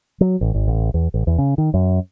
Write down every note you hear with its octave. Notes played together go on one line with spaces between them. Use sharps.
F#3
A1
G#1
A1
E2
A1
E2
C#3
D#3
F#2